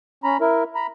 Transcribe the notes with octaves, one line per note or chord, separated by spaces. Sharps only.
C#4 A#5 B5
E4 A#4
A#5 B5